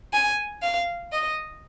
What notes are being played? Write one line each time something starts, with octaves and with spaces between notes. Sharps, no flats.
G#5
F5
D#5